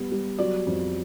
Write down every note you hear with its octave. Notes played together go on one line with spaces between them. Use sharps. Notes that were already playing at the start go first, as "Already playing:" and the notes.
Already playing: G3 B3
G3
F#3 D5
F2